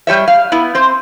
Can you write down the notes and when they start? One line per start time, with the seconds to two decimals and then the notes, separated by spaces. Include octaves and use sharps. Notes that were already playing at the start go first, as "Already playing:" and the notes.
0.07 G3 G4 C#5 E5
0.28 F5
0.52 B3 E4
0.75 C4 C5